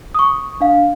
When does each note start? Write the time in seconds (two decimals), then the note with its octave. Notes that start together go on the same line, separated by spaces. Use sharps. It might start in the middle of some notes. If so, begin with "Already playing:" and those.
0.15 C#6 D#6
0.60 D4 F5